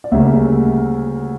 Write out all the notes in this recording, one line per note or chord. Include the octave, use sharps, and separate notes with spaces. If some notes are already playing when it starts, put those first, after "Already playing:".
D5
D2 C#3 G3 A#3 E5